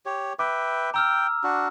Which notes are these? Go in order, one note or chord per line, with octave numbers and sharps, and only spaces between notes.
G4 C#5
B4 E5 G5 D6
G5 A#5 E6 F6
D4 F#4